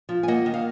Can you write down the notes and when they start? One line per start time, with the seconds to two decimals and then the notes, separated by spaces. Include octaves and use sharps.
0.09 F3
0.23 G#5
0.28 A#3 D#5 F#5
0.46 D#3
0.54 F5